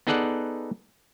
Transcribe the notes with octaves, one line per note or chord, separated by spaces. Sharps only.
B3 D#4 G#4 A4 D5 F#5